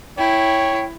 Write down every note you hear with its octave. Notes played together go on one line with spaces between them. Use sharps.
E4 C#5 G5